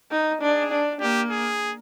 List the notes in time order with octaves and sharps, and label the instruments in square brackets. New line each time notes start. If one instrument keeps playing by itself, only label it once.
[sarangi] D#4
[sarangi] D4 [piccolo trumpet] G#4
[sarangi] D4
[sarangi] A#3 [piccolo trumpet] G4
[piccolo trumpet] G#4